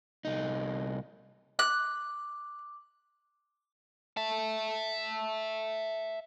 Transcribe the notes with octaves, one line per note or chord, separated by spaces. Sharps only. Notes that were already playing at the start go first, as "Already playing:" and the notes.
C2 D#4
D6 F#6
E5 A5